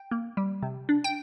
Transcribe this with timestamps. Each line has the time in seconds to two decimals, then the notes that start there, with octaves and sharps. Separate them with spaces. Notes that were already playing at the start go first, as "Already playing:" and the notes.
Already playing: G5
0.11 A#3
0.37 G3
0.63 C3
0.89 D4
1.04 G5